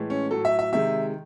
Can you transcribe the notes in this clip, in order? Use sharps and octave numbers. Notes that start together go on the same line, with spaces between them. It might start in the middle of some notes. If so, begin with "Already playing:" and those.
Already playing: A2 E3 G#3
C#4
A2 F#3 A4
E5
E5
C3 D#3 G#3 E5